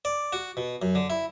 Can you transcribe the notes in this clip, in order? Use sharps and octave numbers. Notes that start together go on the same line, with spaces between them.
D5
F#4
B2
F#2
D3
E4